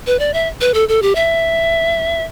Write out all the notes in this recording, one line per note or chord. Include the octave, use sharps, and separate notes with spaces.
B4
D5
E5
B4
A4
A4
G4
E5